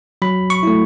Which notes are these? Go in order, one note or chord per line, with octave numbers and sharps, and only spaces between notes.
F#3 B5
C#6
A3 E4